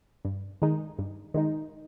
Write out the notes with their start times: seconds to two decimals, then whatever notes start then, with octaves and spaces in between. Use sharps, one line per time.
0.25 G2
0.62 D#3 G#3 D#4
0.99 G2
1.34 D#3 G#3 D#4